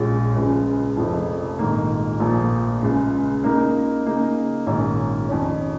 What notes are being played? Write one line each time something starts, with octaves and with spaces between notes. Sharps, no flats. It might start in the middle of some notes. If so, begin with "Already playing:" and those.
Already playing: A#1 A#2 G#3 C#4 F4
C#2 C#3 F3 G#3
F1 F2 F3
A#1 G#2 D#3 A#3
A#1 A#2 F3 A#3 F4
C#2 C#3 G#3
C#3 A#3 D#4 A#4
C#3 A#3 D#4
A#1 G#2 D#3 A#3 C#4
F2 D#3 C#4